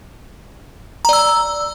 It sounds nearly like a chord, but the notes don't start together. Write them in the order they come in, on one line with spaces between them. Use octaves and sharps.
A#5 D5 E6